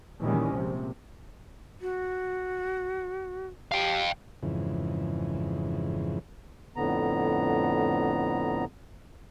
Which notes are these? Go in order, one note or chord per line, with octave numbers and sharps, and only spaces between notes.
A#2 D#3 E3 G3 G#3 C#4
A#1 C3 F3
F#4
G4 F5 G5
F2 G#2 C#3 E3
F2 A2 D3 B3 A#5